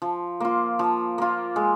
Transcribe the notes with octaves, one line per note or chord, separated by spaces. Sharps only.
F3
A#3 F4
F3
A#3 F4
G#3